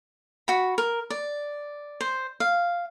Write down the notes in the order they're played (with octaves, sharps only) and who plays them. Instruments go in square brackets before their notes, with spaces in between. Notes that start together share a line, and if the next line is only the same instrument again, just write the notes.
[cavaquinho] F#4 B5
A#4
D5
C5
F5